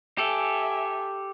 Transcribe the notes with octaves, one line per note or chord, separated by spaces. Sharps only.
G4 A4 E5 G#5